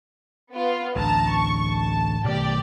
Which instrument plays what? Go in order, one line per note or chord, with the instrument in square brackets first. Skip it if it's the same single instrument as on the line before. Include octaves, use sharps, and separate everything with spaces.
[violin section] B3 F4
[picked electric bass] A1 D2 [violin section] A5 A#5
[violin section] C#6
A5
[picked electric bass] B2 D#3 A3 [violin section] G4 D5